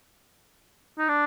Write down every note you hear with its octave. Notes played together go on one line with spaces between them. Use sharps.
D#4
D4